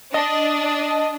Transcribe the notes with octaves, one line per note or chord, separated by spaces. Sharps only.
D4 D#5